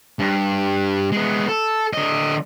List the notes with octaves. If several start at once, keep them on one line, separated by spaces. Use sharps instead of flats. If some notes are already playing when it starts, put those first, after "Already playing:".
G2
G#3 B3
A4
D3 D#5